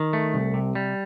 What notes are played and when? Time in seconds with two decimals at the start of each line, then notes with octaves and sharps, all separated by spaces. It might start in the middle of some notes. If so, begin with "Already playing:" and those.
Already playing: D#3
0.13 A3
0.34 C2
0.54 C3
0.75 G3